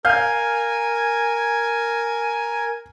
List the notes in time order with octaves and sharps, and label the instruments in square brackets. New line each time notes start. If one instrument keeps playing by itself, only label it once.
[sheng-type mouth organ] A#4 [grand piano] F5 F6 G6 [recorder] G#5